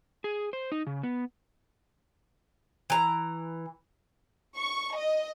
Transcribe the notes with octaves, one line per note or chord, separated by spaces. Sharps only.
G#4
C5
D#4
C#3
B3
E3 A#5
C#6
D#5